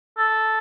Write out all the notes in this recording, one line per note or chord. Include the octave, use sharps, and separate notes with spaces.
A4